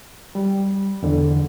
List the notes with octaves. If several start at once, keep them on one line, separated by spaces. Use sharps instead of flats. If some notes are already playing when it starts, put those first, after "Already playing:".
G3
E2 D3